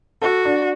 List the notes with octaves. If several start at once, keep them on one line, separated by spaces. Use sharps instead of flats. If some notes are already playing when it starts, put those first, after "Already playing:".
F#4 A4
D4